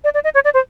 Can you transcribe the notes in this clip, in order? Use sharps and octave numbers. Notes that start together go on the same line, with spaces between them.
D5
D5
D#5
C#5
D5
C5